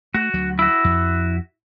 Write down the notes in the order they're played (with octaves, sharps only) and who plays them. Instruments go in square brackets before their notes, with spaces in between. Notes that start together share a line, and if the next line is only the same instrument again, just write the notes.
[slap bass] A3 [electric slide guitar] F#4
[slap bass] D2 F#3
[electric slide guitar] E4 F#4
[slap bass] F2